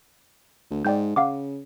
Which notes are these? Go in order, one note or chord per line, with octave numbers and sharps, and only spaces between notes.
D2
G#2 D5 G5 G6
C#3 F5 F#5 D6